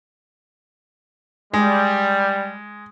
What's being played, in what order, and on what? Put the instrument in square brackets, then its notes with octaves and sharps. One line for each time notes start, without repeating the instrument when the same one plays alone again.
[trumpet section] G3 [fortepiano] G#3